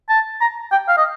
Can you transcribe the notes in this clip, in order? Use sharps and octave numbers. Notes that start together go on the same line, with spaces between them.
A5
A#5
G5
F5
D#5